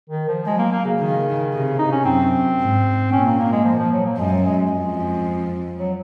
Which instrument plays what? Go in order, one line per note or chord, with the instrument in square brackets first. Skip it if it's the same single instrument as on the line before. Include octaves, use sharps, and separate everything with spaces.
[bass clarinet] D#3
F3
[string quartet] F#3 [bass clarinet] G#3
[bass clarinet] A#3
A#3
C#3
[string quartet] D#3
C3
[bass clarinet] D#4
C#4
[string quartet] F#2 [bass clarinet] C4
[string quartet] G#2
[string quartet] A#2 [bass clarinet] C#4
[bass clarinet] A#3
A#3
G#3
F3
F3
F#3
A#3
[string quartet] F#2 [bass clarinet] G#3
[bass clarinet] F#3
G#3
G#3
[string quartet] F2
[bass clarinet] F#3